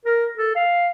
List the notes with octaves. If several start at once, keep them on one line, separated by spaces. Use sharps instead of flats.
A#4
A4
F5